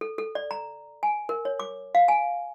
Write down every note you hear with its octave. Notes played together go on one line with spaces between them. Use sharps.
A4
A4
D5
A#5
G#5
A#4
C#5
D6
F5
G#5